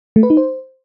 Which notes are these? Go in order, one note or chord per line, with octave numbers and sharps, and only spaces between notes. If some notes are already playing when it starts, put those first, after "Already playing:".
A3
B4
D#4
C5